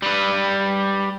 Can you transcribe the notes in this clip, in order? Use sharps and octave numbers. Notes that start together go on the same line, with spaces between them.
G3 B4